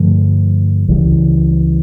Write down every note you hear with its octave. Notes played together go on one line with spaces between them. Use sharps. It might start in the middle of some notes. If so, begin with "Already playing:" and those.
Already playing: G2 D3 F3 A3
C#2 C#3 E3 G3